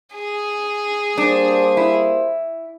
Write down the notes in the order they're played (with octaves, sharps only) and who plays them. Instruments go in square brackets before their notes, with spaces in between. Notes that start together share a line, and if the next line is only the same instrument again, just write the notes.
[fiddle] G#4
[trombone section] G3 A#3 C5 [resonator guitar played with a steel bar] D4
[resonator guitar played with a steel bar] E4